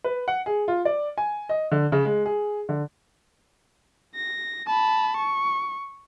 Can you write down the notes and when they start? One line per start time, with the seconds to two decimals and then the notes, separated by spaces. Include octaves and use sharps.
0.04 B4
0.28 F#5
0.46 G#4
0.68 F4
0.85 D5
1.18 G#5
1.49 D#5
1.71 D3
1.92 C#3
2.05 G#3
2.26 G#4
2.69 D3
4.15 A#6
4.67 A5 B5
5.17 C#6